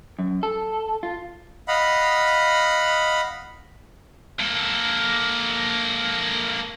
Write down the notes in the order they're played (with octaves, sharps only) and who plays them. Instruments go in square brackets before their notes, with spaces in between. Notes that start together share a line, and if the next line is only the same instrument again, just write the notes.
[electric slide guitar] F#2
A4
F4
[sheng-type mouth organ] D#5 F5 F#5 B5
[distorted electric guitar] A#3 A4